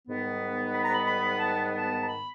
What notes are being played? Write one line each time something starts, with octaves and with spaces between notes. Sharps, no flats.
G#2 D#3 G3 B3
B5
A#5
B5
B5
A5
A5
A#5
B5